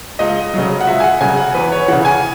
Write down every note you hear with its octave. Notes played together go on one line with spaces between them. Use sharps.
C#2 D#5
C#3 F#3
F#5
C#2 E5
G#5
F#5
C#3 F#3 G#5
F#5
E2 B4
C#5
C#3 E3 F#5
G#5